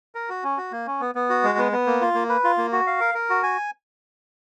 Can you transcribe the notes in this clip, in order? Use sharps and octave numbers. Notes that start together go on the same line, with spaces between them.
A#4
F#4
C#4
F#4
A#3
C#4
B3
B3
F#4
G#3
B3
B3
A#3
F4
A#3
B4
F4
A#3
F#4
F5
A#4
A#4
F#4
G#5